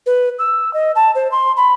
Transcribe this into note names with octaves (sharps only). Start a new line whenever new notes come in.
B4
E6
D#5
A5
C5
C6
B5